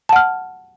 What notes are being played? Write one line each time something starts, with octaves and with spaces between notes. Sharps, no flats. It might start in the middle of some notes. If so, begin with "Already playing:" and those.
F#5 A5 F6